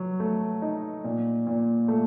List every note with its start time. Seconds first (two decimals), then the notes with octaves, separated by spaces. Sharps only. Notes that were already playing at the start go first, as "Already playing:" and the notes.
Already playing: F#3
0.20 A3
0.62 D#4
1.04 A#2
1.47 A#2
1.88 A3